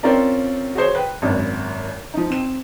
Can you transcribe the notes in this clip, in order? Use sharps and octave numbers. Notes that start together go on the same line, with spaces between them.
C4 C#4 F4 A#4 D5 A#5
F#4 G#4 C5 C#5
B4 G5
G#1 F#2 D4
F3 D#4
C4 E7